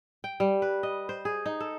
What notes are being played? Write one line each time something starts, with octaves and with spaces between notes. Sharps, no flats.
G5
G3
B4
D#5
C5
G#4
D#4
A4